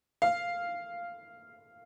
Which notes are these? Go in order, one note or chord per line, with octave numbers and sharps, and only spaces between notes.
F5